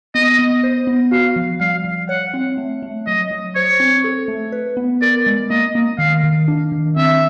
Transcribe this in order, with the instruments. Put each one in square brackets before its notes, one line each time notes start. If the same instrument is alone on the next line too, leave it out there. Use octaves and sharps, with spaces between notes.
[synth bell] B3 [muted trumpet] D#5
[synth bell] B3
C5
B3
[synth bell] F#4 [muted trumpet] F5
[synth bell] F3
[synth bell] G3 [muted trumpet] F5
[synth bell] G3
[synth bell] C#5 [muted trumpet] F#5
[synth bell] C4
A3
A3
[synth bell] F#3 [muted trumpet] D#5
[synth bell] F#3
[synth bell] C5 [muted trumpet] C#5
[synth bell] C4
A4
A3
B4
B3
[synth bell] A#4 [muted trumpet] D5
[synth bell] G#3
[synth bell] A#3 [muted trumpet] D#5
[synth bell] A#3
[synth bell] D#3 [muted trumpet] F5
[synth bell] D#3
D4
D#3
[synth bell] C4 [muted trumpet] E5